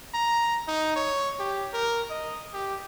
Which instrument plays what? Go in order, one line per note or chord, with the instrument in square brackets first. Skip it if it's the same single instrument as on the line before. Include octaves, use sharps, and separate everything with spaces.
[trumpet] A#5
D#4
C#5
G4
A#4
D#5
G4